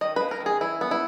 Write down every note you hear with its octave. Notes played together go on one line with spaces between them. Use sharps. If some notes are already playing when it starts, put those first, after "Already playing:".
D#3 D#5
A#3 B4
A#4
D#3
G#4
E3 E4
B3
E4